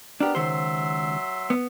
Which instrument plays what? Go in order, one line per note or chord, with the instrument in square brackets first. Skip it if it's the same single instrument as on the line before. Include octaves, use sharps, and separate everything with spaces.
[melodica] B3 A#4 [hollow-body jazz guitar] D4 G4
[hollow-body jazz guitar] C#2 D#3 C5 [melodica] F#3 E5 C6
[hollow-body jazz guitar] B3